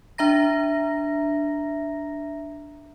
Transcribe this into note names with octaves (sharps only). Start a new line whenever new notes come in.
D4 E5 A#5 A#6